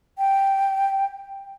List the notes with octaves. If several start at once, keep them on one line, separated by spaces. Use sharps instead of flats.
G5